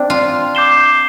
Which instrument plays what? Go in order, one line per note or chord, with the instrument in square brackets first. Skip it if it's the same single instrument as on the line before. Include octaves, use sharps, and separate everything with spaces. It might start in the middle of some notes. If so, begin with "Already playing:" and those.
Already playing: [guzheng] C4 D4
F4
[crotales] D6 G6 C7 E7 G7